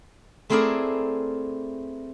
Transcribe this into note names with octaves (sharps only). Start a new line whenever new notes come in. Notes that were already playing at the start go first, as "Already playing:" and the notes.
A3 C4 E4 G#4 A#4 D5